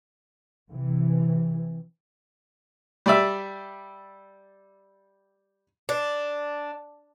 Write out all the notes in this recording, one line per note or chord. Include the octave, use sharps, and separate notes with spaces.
C3 E3
G3 D5 E5
D4